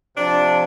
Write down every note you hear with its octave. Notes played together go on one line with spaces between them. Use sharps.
C3 F3 D4